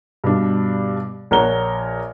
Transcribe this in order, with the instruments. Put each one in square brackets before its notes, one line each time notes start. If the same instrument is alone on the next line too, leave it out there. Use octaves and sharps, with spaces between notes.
[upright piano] G2 B2 G3 D4
A#1 A#4 C#5 F#5 A#5 G7